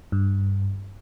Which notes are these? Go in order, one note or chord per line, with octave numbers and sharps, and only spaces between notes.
G2